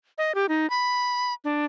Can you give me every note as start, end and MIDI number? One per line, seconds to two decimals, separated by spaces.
0.18 0.35 75
0.35 0.46 67
0.49 0.69 63
0.70 1.33 83
1.44 1.65 62